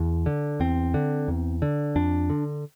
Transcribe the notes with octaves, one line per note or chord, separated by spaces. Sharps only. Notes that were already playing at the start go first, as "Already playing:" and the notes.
Already playing: E2
D3
E2 C4
D3
E2
D3
F2 D4
D3